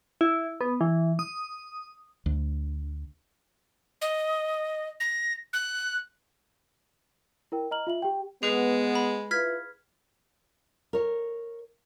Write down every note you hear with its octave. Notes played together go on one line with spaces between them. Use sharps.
E4
B3
E3
D#6
D2
D#5
A#6
F#6
E4 A#4 G5
D#5 A#5 F6 F#7
F4 E5 F#7
G4 G5
G#3 B3 G#4 B4
B5
E4 F4 B4 F6 G#6 B6
A#4 C#5